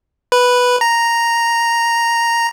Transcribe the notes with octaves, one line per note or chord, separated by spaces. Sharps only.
B4
A#5